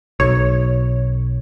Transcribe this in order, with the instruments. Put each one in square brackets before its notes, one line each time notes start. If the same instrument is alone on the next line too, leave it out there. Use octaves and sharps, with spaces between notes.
[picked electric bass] B1 [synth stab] C#5